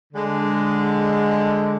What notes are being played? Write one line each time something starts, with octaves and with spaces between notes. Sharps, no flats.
D3 G#3